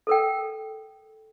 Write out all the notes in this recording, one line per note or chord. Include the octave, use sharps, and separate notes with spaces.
A4 A#4 G5